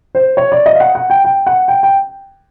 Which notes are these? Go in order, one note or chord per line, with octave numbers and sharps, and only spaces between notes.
C5
C#5
D5
D#5
F5
F#5
F#5
G5
G5
F#5
G5
G5